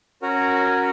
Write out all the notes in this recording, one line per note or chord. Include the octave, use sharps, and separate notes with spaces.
C#4 F#4 A#4